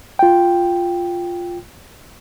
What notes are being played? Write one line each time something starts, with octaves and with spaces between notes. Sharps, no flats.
F4 G5